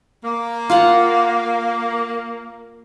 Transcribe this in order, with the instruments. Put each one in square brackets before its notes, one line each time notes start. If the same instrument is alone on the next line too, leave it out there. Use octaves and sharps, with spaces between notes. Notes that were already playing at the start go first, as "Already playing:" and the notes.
[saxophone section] A#3
[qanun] F4 F5 F#5